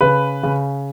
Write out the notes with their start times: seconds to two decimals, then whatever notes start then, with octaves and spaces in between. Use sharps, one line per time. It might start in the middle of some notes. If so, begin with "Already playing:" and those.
0.01 C#3 B4
0.43 C#3